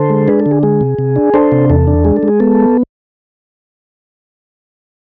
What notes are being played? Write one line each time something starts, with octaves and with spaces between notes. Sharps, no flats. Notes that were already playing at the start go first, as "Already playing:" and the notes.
Already playing: D3 A4 C5
G#3
D4 G#4 B4
A4
D3
G#4
G#3 G#4
C3
C3
D4
D4 A4 C5
C3
E2 A4
D4
G#3 G#4
A4
G#3
G#4
B3 A4